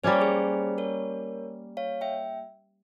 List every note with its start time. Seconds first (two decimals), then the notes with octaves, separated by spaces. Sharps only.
0.04 G3 A#3 C#4 C5
0.13 C#5
0.21 G#4 C5
0.78 A#4 C#5
1.77 C#5 F5
2.01 E5 G5